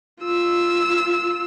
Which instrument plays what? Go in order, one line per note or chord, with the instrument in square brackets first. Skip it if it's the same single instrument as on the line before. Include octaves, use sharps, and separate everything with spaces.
[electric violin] F4 E6